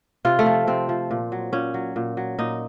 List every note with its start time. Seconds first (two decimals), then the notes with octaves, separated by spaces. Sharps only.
0.25 C3 F4
0.39 A3
0.46 F3
0.67 C3 C4
0.89 F3
1.11 A#2
1.32 F#3
1.53 A#2 C#4
1.74 F#3
1.96 A#2
2.17 F#3
2.38 A#2 D#4